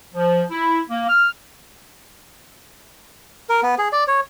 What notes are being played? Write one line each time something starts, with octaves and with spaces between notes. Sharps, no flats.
F3
E4
A#3
F6
A#4
B3
G#4
D5
C#5